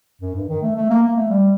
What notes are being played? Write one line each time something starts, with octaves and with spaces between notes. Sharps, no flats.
F#2
G2
D#3
A3
A3
A#3
A#3
A3
G3